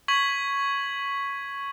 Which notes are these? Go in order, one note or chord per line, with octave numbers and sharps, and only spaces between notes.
C#6 G#6 B6 F#7